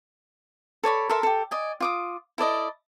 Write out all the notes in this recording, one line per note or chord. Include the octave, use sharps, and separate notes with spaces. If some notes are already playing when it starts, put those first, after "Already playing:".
A4 C#5 D5 B5
A4 A#4 E5 C6
G4 A4
D5 D#5 G#5
F4 D6 D#6
E4 A4 D5 D#5